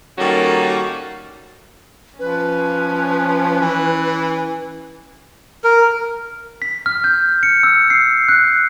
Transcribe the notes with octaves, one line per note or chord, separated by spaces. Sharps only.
D#3 G3 A#3 C#4 F#4 A4
F3 C#4 B4
E3
A#4
B6
F6
G6
C#7
E6
C7
F#6